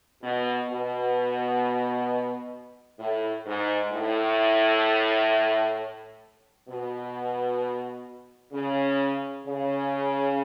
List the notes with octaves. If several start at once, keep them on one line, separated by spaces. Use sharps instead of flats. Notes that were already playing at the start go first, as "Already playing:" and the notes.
B2
B2
A2
G#2
A2
B2
C#3
C#3